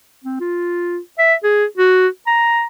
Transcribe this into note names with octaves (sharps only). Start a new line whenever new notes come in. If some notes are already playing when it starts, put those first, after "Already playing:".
C4
F4
E5
G#4
F#4
A#5